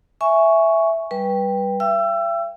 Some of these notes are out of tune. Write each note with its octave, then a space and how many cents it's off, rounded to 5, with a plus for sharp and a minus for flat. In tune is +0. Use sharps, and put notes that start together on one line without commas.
E5 +0 G#5 +0 C#6 +5
G3 +0 B4 -15 G5 +10
E5 +45 G5 +0 E6 +25